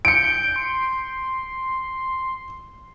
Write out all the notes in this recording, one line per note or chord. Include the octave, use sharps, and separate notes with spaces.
G6 C#7 D7
C6